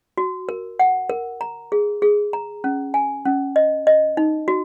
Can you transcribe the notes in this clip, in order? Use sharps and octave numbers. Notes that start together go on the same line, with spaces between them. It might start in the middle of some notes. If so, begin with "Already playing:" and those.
F#4
A#4
F#5
A#4
A#5
G#4
G#4
A#5
C#4
G#5
C#4
D#5
D#5
D#4
F#4